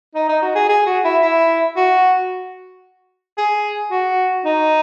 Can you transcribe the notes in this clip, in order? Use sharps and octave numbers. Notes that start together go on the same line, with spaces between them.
D#4
D#4
F#4
G#4
G#4
F#4
E4
E4
F#4
G#4
F#4
D#4